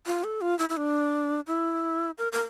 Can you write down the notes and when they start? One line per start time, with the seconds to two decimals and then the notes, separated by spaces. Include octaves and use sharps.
0.06 F4
0.24 A4
0.41 F4
0.59 E4
0.69 E4
0.77 D4
1.47 E4
2.18 A#4
2.32 A#4